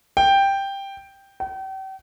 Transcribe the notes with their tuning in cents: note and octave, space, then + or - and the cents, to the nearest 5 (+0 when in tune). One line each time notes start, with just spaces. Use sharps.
G5 +5
G5 -40